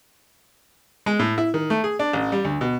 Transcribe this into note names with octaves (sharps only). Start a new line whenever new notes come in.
G#3
A2
E4
D#3
A3
G#4
D4
A1
G3
D2
B2